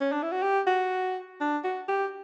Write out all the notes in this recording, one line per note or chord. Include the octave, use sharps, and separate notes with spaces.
C#4
D4
E4
F#4
G4
F#4
D4
F#4
G4